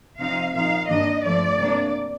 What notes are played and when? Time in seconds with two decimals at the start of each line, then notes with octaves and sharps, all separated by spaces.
0.19 C3 F3 C4 D#4 F5
0.54 A#2 F3 C4 D#4 F5
0.89 G2 D#3 G3 A#3 D4 D#5
1.24 G2 F3 A3 D5
1.59 C3 G3 A#3 D4